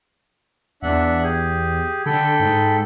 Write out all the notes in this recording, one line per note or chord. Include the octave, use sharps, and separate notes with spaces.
E2 D4 E5 F#5
G4 G#4
D3 A4 G5 B5
G#2